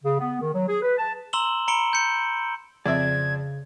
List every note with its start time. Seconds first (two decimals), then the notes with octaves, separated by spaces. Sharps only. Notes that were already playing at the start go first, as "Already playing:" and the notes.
0.04 C#3
0.19 B3
0.40 D#3
0.53 F#3
0.67 G#4
0.82 B4
0.97 A5
1.33 A#5 C6 E6 E7 F#7 G7
1.68 A#5 B5 C#7 D7 G7
1.93 G6 C#7
2.86 F2 C#3 C4 D5 E5 G#6